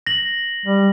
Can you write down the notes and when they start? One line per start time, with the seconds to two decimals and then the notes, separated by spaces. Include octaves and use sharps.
0.07 A#6 F#7
0.66 G3